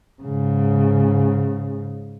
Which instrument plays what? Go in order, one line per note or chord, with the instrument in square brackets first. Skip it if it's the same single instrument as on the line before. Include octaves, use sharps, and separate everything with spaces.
[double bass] G#2 C#3